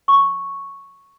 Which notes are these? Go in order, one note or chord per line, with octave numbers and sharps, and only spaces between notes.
C#6